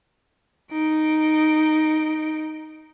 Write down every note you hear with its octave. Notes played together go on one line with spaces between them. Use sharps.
D#4 D7